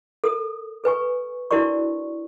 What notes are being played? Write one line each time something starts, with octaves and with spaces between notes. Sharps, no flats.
A4 A#4 D#6
A4 B4 G#5 C#6
D4 E4 F#4 A#4 D5 C#6